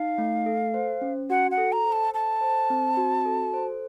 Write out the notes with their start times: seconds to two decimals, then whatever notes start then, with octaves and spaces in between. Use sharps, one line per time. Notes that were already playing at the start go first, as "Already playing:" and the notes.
Already playing: D#4 F5
0.18 A3
0.46 A4
0.74 C5
1.01 C#4
1.30 F#4 F#5
1.51 F#5
1.58 A4
1.72 A#5
1.86 C5
1.92 A5
2.14 A4 A5
2.41 C5
2.70 C4
2.97 F#4
3.25 A4
3.54 C5